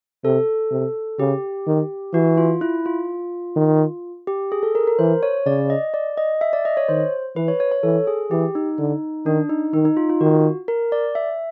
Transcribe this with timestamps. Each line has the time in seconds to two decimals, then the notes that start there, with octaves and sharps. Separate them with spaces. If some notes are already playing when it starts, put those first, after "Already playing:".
0.24 C3 A4
0.71 C3
1.19 C#3 G4
1.67 D#3
2.14 E3 F#4
2.37 F4
2.61 E4
2.86 F4
3.56 D#3
4.27 G4
4.52 G#4
4.63 A4
4.75 A#4
4.87 A#4
4.99 E3 C5
5.23 C#5
5.46 C#3 D5
5.70 D#5
5.94 D5
6.17 D#5
6.41 E5
6.53 D5
6.65 D#5
6.77 C#5
6.89 D#3 C5
7.36 E3 B4
7.48 C#5
7.60 C#5
7.72 C#5
7.83 E3 A4
8.07 G#4
8.31 E3 G4
8.55 D#4
8.79 D3
9.26 D#3 D4
9.49 D#4
9.73 D#3 D#4
9.85 D#4
9.97 F4
10.10 F4
10.21 D#3 F#4
10.68 A#4
10.92 D5
11.15 E5